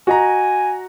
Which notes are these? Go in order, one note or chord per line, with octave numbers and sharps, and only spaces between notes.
F#4 D#5 G#5 A#5